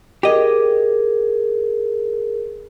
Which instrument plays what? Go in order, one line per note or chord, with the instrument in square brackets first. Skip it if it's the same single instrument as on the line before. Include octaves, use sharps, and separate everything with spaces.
[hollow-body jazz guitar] G4 D#5 [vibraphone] G#4 A#4